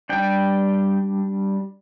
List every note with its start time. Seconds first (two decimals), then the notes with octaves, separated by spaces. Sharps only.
0.09 G3 D4 G5